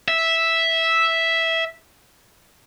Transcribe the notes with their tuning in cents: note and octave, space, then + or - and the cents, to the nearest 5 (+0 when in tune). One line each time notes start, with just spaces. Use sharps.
E5 -5